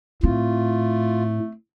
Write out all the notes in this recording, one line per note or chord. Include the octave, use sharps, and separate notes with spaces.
A2 A3 C4 F4